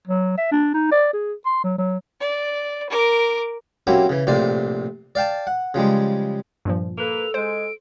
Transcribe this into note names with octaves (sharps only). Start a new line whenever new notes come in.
F#3
E5
D4
D#4
D5
G#4
C6
F#3
F#3
D5
A#4 D6
F#3 A#3 C4 C#4 E4 G4
C#3 E3
A#1 A2 C3 A#3 C5 D5
D5 F5 G5 A5
F#5
C#3 F3 G3 G#3
G2 A#2 F3
A#3 A4 B4 F7
G#3 C5 D7